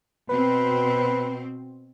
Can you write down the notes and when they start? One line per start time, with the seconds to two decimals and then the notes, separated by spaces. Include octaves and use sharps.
0.30 B2 C4 B4